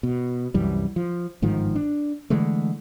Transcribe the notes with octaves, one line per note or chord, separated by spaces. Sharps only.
B2
C2 F#2 E3 G3
F3
G1 G#2 D#3 F3
D4
D3 E3 G#3 A3